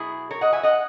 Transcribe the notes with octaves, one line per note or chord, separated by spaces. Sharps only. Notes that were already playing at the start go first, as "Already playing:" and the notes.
Already playing: B2 F#3 E4 G#4
A#4 C#5
D#5 F#5
E5 G#5
D#5 F#5